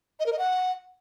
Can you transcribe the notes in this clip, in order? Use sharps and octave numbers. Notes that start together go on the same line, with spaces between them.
D#5
A#4
D#5
F#5